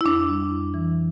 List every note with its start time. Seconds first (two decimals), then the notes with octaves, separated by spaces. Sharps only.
0.01 E4
0.05 F2 D4
0.29 G3
0.51 F2
0.74 E3